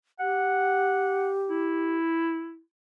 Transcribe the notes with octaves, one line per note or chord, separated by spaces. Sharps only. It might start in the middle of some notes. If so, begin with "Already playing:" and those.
G4 F#5
E4